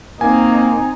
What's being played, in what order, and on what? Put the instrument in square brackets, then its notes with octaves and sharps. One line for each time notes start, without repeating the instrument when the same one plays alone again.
[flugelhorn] A#3 [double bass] C4 D#4 [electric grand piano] G#5